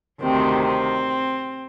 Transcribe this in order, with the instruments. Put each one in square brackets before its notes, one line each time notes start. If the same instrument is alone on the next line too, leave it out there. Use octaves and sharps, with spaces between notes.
[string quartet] D2 C3 D#3 C4
C4